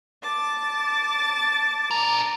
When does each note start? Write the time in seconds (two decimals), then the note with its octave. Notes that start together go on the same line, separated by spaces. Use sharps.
0.23 A5 D6 A6
1.91 D4 A#4